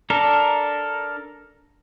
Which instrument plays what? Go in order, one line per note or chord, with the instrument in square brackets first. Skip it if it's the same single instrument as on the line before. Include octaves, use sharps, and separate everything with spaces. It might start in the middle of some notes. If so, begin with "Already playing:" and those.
[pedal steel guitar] D4 A4 A#4